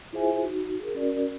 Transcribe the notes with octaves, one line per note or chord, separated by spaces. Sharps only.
E4 F4 G#4 C5 E5 G#5
D#4 F#4
G#4 A#4
C#4 F#4 A#4 D5